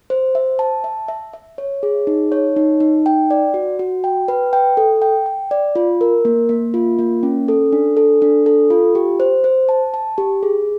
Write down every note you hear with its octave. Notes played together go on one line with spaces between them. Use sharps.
C5
E5
A5
E5
E5
E5
C#5
G#4
D#4
C#5
D#4
D#4
G5
D5
F#4
F#4
G5
B4
G5
A4
G5
G5
D5
F4
A#4
A#3
A#3
F4
A#3
C#4
A4
D4
A4
D4
A4
F4
G4
C5
C5
A5
A5
G4
G#4